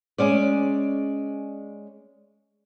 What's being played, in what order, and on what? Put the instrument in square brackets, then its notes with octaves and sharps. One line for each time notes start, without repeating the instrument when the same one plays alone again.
[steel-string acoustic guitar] G#3 C#4 D5